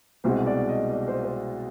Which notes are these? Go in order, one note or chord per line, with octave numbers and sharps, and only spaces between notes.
C2 B2 G#3 C5
D5
D#5
D5
C5
C5